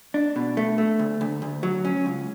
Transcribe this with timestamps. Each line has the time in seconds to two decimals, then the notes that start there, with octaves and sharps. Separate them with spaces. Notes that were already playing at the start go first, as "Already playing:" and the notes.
0.14 D4
0.36 B2
0.57 A3
0.78 A3
0.99 D2
1.21 D2
1.42 D2
1.63 F#3
1.85 C#4
2.06 C#2